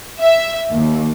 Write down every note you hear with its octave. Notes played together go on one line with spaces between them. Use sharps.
E5
D#2